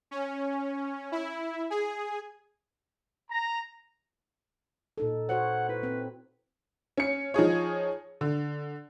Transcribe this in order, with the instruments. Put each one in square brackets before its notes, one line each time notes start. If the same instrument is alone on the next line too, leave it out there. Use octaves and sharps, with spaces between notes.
[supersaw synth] C#4
E4
G#4
[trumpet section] A#5
[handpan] A#2 D#4 A4
[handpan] F#4 C5 C#5 [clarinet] F#5
[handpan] E4 [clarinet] B4
[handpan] C4
[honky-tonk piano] C#4 C#7
F3 D#4 G#4 C#5
D3